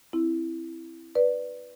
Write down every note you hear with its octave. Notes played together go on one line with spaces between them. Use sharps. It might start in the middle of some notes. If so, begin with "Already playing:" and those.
C4 E4
B4 D5